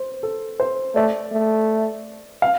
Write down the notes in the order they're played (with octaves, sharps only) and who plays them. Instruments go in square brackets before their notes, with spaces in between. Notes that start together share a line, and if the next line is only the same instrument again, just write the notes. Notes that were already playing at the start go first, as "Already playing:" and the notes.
Already playing: [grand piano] C5
A4
C5
[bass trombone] A3 [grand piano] D5
[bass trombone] A3
[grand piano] F5